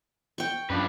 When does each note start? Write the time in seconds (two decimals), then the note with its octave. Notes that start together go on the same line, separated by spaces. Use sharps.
0.38 G5 C#6
0.70 F#2 F3 D4 B4